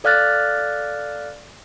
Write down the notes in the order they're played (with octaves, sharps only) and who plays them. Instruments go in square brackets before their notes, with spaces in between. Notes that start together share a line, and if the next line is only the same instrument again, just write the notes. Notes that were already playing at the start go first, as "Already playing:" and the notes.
[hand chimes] A4 D5 F5 F6 F#6 A6